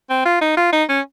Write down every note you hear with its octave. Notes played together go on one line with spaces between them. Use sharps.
C4
F4
D#4
F4
D#4
C#4